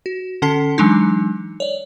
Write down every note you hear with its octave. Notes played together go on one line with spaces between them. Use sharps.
F#4
D3 C#4 A4 A5 C7
E3 F#3 G#3 D4 D#4
C#5 D5